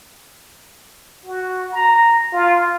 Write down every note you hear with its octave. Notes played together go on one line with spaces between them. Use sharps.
F#4
A#5
F4